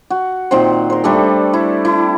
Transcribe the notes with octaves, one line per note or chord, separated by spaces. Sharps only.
F#4
A#2 D#3 C4 C5
A#4 C5
G3 A3 D4 A4
E4
E4